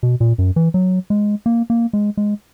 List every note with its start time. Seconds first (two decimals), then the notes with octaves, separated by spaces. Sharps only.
0.03 B2
0.20 A#2
0.38 F#2
0.56 E3
0.74 F#3
1.10 G#3
1.46 A#3
1.70 A#3
1.93 G#3
2.17 G#3